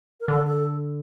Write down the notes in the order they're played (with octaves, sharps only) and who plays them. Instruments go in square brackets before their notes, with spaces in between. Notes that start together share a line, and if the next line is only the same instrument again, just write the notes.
[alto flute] A#4
[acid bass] D3 [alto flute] A4
[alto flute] A4